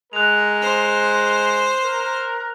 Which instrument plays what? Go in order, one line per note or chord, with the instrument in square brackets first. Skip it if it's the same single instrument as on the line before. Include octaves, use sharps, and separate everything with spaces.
[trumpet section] G#3 A#4 [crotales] F#6 F7
[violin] C5
[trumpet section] A#4